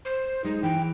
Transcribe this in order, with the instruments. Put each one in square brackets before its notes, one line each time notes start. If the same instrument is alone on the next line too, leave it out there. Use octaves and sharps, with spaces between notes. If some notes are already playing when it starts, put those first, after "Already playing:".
[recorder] C5
[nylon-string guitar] G#3 [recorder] D#4
[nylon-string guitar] E3 [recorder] G5